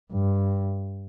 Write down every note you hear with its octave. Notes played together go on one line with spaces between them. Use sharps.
G2